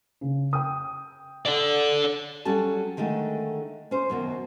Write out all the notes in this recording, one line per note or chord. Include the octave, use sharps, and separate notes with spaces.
C#3
G5 D#6
A4 D5
F#3 G3 C#4 A4 A5
D3 D#3 G#3 A3
C#4 C5
F#2 B2 D#3